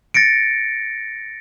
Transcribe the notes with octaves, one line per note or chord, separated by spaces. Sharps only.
A6 A#6 C#7 D7